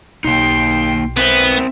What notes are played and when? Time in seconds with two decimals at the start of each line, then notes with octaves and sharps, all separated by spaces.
0.24 B1 A#3 D#4 G5 C6
1.17 B3 C4 A#4 C5 E5